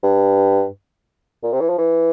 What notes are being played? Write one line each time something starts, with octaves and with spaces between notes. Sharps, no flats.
G2
A#2
C3
E3
F3
E3